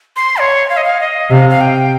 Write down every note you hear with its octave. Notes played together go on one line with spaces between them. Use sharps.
C6
C#5
F5
D#5
F5
D#5
C3 F5
F5
G5